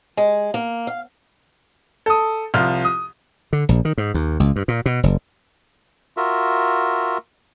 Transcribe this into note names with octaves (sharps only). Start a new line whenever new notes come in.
G#3
A#3
F5
A4 D#6
C2 F3 F4 F6
D#6
D3
A#1
D#3
G#2
D#2
C#2
G2
A#2
B2
F#1
F4 F#4 A#4 E5